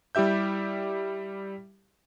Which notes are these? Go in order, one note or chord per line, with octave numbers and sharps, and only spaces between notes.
G3 E4 G4 E5 G6